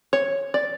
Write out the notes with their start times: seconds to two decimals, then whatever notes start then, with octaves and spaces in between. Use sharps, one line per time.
0.13 C#5
0.54 D5